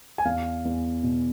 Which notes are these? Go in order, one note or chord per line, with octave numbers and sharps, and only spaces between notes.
G#5
E2 F5
E2
B2